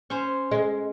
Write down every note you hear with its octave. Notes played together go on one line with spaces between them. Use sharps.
C#4 C5
G#3